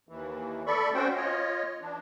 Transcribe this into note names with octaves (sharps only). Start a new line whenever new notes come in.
D#2 E3
A3 A4 D5 B5 C#6
C4 C#4 F#4 C5 G5
F4 C#5 D#5
E3 D4